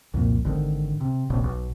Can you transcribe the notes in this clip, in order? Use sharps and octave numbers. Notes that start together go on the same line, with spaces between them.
C2 F2 A#2
G#1 D3 D#3
C3
D#1 A#1 C3
B1